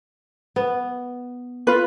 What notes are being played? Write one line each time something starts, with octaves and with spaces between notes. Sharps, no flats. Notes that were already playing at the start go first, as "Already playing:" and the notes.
B3
F4 B4